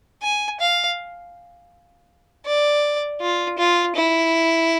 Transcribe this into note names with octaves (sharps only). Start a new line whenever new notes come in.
G#5
F5
D5
F4
F4
E4